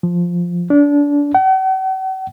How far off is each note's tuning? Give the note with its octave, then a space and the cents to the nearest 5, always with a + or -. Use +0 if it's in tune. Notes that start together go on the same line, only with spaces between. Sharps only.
F3 +0
D4 -25
F#5 +45